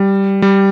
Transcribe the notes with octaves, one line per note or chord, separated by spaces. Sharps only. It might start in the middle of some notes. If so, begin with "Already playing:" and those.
Already playing: G3
G3